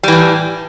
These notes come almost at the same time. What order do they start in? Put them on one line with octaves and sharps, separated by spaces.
G3 E3 A2